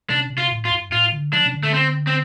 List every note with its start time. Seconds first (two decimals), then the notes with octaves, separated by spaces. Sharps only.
0.10 C3 D4
0.30 C3
0.38 F4
0.52 A2
0.65 F4
0.71 G2
0.92 A2 F4
1.12 D3
1.33 F3 D4
1.46 C3
1.54 D3
1.63 A3
1.74 C4
2.07 C4